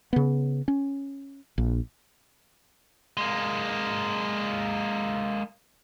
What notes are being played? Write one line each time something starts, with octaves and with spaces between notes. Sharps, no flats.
C#3 B3
C#4
A#1
G#3 A#3